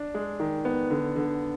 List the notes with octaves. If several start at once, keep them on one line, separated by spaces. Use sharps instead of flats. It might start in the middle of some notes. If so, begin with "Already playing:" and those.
Already playing: D4
G#3
D#3
B3
D3
D3